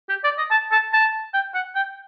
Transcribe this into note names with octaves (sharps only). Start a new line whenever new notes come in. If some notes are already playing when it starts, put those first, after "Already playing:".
G4
D5
D#5
A5
A5
A5
G5
F#5
G5